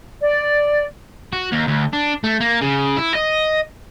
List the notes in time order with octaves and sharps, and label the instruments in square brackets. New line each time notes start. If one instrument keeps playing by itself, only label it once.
[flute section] D5
[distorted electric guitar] F#4
D#2
D2
D4
A3
A#3
C#3
E4
D#5